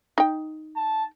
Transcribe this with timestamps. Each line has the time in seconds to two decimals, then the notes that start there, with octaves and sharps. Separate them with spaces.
0.18 D#4 G5
0.76 A5